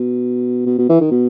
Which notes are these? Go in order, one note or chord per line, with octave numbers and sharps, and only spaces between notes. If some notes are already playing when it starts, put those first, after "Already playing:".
Already playing: B2
B2
B2
E3
D#3
B2